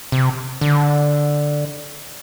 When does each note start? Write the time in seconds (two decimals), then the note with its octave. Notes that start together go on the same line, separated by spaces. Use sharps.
0.12 C3
0.61 D3